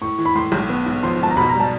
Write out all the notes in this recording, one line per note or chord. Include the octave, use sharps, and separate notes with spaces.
A2 C#6
E3
B5
A2 C6
B1
B3
G#2
F3 C6
G#2 A5
A#5
B2 B5
A#5
G3
A5